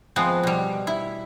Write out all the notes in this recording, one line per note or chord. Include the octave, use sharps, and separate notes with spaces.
F3 G#3 B3 C4
B2 G3
E4